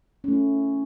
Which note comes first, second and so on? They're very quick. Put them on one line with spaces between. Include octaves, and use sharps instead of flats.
C#4 A3 E4